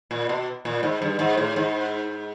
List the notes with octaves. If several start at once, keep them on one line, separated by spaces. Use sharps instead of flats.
A#2
B2
A#2
G#2
G2
G#2
A2
G#2